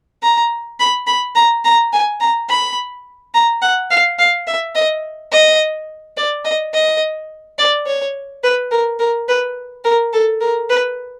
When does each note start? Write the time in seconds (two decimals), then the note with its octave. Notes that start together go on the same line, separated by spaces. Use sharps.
0.22 A#5
0.80 B5
1.07 B5
1.35 A#5
1.65 A#5
1.93 G#5
2.20 A#5
2.49 B5
3.34 A#5
3.62 F#5
3.91 F5
4.19 F5
4.47 E5
4.75 D#5
5.32 D#5
6.17 D5
6.45 D#5
6.74 D#5
7.58 D5
7.87 C#5
8.43 B4
8.71 A#4
8.99 A#4
9.28 B4
9.85 A#4
10.13 A4
10.41 A#4
10.70 B4